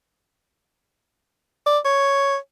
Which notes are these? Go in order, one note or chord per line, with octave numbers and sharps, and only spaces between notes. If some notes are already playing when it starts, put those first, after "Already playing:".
D5
C#5